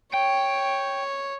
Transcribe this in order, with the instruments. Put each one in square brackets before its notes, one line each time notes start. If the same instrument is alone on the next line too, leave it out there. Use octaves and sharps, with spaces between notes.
[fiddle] C#5 [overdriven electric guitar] G5